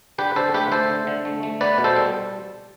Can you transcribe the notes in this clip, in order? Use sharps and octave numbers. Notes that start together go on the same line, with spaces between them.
D3 G4 B4
D3 A4 C5
A3 G4 B4
A3 A4 C5
D3
D3
A3
A3
B3 B4 D5
B2
A4 C5
G3